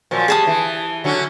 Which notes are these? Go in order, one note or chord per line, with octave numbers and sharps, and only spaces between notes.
A#2 F3 F#3
G3 G#4 A5 D#6
E3
D3 F#3 C#4